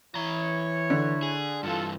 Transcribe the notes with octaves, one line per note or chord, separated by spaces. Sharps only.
E3 E4 C#5 A#5
D3
G#4
G2 E3 F4 A4